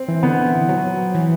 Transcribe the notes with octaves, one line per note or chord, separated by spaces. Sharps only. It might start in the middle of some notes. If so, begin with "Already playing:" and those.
Already playing: C4
E3
D3 B3
E3
F#3
E3